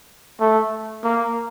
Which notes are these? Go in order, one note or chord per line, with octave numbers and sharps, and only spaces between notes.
A3
A#3